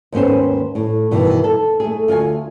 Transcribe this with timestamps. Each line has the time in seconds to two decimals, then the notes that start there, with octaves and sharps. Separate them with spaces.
0.12 D#2 G#2 B3 C#4 C5
0.75 A2
1.11 G2 B2 D#3 E3
1.44 A4
1.80 A3 G#4
2.08 D2 F4 F#4 G#5